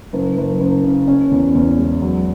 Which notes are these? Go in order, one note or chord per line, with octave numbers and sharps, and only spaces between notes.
F#1
F#1
F#1
C#3
C#4
E2
E2
G#3
F#3